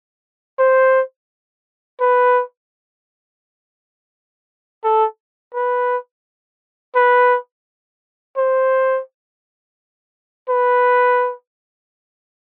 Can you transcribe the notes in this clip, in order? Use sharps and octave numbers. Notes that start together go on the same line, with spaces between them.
C5
B4
A4
B4
B4
C5
B4